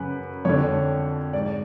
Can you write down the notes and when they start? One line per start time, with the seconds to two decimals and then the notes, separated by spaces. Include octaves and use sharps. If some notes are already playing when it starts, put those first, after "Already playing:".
Already playing: F#2 C#3 B4
0.45 F2 D3 C#5
1.33 G#2 D5